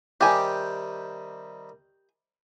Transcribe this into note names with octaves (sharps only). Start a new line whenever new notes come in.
C3 D#3 G3 G4 G#5